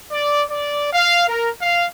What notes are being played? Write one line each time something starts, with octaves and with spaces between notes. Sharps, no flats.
D5
D5
F5
A#4
F5